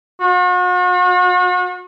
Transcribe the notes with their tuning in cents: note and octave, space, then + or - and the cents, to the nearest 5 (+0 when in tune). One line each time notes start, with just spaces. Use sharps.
F#4 -40